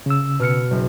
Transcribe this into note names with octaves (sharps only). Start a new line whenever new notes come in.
C#3 E6
B2 F6 C#7
F#1